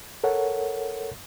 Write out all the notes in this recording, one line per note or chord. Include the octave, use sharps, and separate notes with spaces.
A4 A#4 C#5 F#5